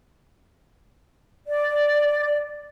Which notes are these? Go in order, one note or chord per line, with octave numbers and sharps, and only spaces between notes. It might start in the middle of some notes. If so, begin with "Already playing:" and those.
D5